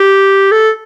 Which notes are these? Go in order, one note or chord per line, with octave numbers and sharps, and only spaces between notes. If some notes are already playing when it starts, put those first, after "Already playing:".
Already playing: G4
A4